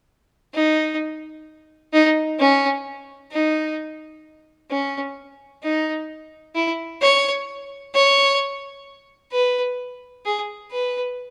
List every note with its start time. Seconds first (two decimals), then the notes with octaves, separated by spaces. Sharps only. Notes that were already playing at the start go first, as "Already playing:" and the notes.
0.54 D#4
1.93 D#4
2.39 C#4
3.32 D#4
4.71 C#4
5.63 D#4
6.55 E4
7.02 C#5
7.94 C#5
9.32 B4
10.26 G#4
10.71 B4